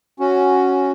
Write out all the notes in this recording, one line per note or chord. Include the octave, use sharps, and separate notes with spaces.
C#4 F#4